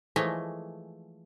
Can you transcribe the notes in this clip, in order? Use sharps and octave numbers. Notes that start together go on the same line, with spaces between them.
E3 F3 G#3 A3 C#5 D#5